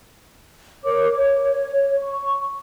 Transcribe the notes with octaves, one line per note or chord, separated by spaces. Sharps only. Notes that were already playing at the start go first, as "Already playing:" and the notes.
A#4 C#5 D6
C#5
C#6